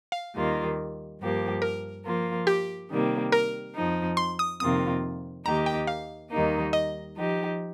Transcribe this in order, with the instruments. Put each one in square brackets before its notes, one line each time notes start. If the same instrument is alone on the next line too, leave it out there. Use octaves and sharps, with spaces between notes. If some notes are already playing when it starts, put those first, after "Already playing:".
[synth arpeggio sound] F5
[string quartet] D#2 D#3 G3 A#3 F4
G2 F3 A#3 G4
[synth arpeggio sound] A#4
[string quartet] F3 A#3 F4
[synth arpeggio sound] G4
[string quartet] C3 D#3 G3 A#3
[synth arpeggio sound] A#4
[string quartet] F2 F3 D#4
[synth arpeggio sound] C6
D#6
[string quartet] F2 C3 D#3 A#3 F4 [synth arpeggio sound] D#6
[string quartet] D#2 D#3 A#3 D#4 G4 [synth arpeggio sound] A#5
[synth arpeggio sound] G5
F5
[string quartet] D#2 D#3 G3 A#3 D#4
[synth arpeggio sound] D#5
[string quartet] F3 D#4 G4